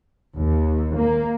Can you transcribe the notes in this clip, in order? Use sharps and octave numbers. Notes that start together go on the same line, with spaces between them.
D#2
A#3